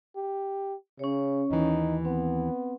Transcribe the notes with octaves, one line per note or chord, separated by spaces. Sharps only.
G4
C#3 C#4 C#5
D#2 E3 D#4
B3 C4